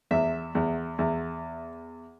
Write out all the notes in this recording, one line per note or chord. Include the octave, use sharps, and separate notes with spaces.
E2 E5
E2
E2